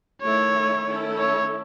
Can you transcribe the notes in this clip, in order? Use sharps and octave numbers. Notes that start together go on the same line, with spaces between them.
D#3 A3 E4 C#5
D#3 A3 C#4 E4 A4
C#5